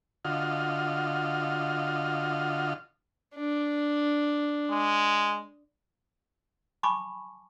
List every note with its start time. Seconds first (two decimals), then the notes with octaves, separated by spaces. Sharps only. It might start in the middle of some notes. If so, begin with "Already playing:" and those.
0.25 D3 F4 F#4 D#5 F6
3.35 D4
4.70 G#3
6.83 G#5 A5 B5 C#6 D6